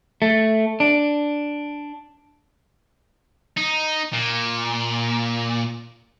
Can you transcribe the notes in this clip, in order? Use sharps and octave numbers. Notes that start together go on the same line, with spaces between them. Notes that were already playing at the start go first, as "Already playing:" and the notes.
A3
D4
D#4
A#2